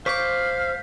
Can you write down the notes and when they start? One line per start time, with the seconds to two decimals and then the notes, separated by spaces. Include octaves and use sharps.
0.06 C5 F5 C#6 D6 G6 B6